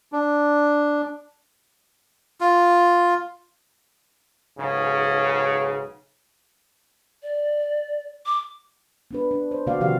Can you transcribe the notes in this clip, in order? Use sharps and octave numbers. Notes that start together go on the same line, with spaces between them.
D4
F4
B1 G#2 C#3
D5
D6
B3 D4 B4
D4
C5
B2 D3 A#3 F#4 D5 F5
C3 D#3 F3 F#4 G4 F5